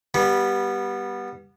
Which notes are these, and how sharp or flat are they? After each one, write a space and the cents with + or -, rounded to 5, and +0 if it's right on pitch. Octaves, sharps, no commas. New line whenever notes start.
G3 +0 B3 -20